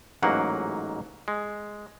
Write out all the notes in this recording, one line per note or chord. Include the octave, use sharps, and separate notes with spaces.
A1 G#2 F#3 A#3 F#5
G#3